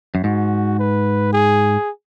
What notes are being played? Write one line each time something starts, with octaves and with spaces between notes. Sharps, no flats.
F#2
G#2 F#4
B4
G#4